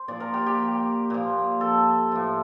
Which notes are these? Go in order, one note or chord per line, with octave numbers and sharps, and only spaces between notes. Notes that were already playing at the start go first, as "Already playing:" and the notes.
Already playing: C5
A#2 F3 D5
A#4
G4
G4
A#2 F3
A4
A2 F3